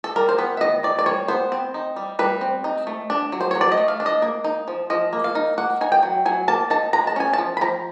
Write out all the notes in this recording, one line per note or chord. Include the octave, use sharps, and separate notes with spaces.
A4
G3 A#4
C5
B3 B4
E5
D#3 D#5
D#3 D5
D5
G3 C#5
B3 C5
C4
D#4
G3
G3 B4
C4
D#4
A3
D4
F#3
C5
F#3 C#5
D5
D#5
A3
F5
D4
D#5
A#3
D#4
F3
F3 D#5
A#3
F5
D#4
A#3 F#5
D#4 G#5
G5
F#3
F#3 G#5
A#3 A5
D#4 A5
G#3 A#5
A5
C#4 G#5
F3 A5
B5
F3 A#5